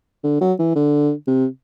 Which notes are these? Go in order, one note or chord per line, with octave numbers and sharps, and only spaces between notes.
D3
F#3
E3
D3
C3